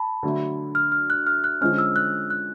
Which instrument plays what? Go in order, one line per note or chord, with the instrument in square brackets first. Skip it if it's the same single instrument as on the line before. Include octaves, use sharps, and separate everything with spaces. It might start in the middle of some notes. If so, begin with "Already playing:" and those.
Already playing: [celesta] A5 B5
[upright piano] D3 F#3 A3 D4
[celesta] F6
F6
F#6
F6
F#6
[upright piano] D3 F3 G#3 C#4 [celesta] F6
[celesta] E6
F#6
F#6